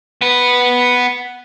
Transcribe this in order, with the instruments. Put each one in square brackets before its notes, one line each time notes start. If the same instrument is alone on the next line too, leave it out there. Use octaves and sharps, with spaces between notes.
[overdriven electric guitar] B3 B4